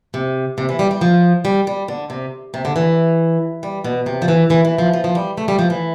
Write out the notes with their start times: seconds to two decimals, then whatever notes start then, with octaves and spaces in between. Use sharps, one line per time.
0.14 C3
0.58 C3
0.69 E3
0.79 G3
0.91 G3
1.01 F3
1.45 G3
1.67 G3
1.88 D3
2.10 C3
2.54 C3
2.65 D3
2.76 E3
3.63 G3
3.84 B2
4.06 C3
4.22 F3
4.28 E3
4.50 E3
4.65 E3
4.78 F3
4.94 F3
5.04 F3
5.15 G3
5.38 A3
5.48 G3
5.59 F3
5.70 E3